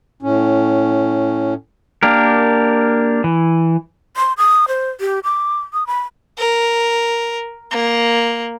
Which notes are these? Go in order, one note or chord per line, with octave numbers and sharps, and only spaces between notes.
A2 C#4
A#3 D4 G4 A#4
E3
C6
D#6
C5
G4
D6
D#6
B5
A#4
A#3